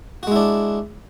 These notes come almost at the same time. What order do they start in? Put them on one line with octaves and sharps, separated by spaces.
F#4 G#3 E4 D4